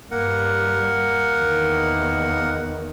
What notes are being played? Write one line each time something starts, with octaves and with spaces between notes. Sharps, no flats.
G2 G3 A#3 A#4 F#5
E2 D#3